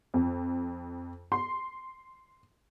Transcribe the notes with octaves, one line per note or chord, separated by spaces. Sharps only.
F2
C6